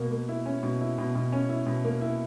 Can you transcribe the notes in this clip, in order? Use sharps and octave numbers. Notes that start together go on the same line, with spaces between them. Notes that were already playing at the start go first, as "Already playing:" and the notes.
Already playing: B2 A#3
A#3
E4
C#4
B2
E4
B2
B2
C#4
E4
B2
A#3
E4